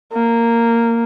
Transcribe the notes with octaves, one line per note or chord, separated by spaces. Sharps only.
A#3